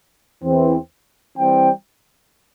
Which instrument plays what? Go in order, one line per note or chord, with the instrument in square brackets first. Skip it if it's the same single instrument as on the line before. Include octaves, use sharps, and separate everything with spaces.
[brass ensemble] E2 E3 C4
E3 G3 C4 G5